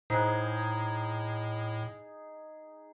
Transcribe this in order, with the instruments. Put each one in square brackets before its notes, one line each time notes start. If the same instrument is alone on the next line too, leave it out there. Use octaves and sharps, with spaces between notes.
[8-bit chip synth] A2 [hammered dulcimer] D#4 G#4 [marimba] C5 F#6